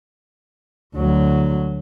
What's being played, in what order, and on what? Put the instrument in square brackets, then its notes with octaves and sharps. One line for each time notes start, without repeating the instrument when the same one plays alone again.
[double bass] D2 F#3